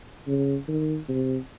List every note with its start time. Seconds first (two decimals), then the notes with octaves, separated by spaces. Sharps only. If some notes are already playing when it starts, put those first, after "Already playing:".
0.27 C#3
0.68 D#3
1.08 C3